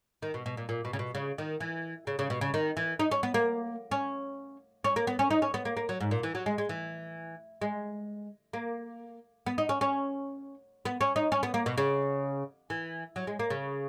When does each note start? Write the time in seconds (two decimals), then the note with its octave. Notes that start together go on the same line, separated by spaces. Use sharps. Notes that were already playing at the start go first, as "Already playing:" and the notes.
0.22 D#3
0.34 B2
0.46 B2
0.57 A#2
0.69 A#2
0.85 B2
0.93 C#3
0.99 B2
1.15 C#3
1.38 D#3
1.60 E3
2.07 C#3
2.19 C#3
2.30 B2
2.41 C#3
2.54 D#3
2.77 E3
2.99 D#4
3.11 C#4
3.23 B3
3.34 A#3
3.91 C#4
4.84 C#4
4.96 A#3
5.07 B3
5.19 C#4
5.31 D#4
5.42 C#4
5.54 B3
5.65 A#3
5.77 A#3
5.89 F#3
6.00 G#2
6.11 A#2
6.23 E3
6.35 F#3
6.46 G#3
6.58 G#3
6.69 E3
7.62 G#3
8.53 A#3
9.46 B3
9.58 D#4
9.69 C#4
9.81 C#4
10.85 B3
11.01 C#4
11.16 D#4
11.32 C#4
11.43 B3
11.54 A#3
11.66 B2
11.78 C#3
12.70 E3
13.16 F#3
13.27 G#3
13.39 A#3
13.50 C#3